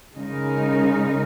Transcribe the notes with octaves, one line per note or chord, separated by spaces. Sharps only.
C#3 G#3 D#4 A#4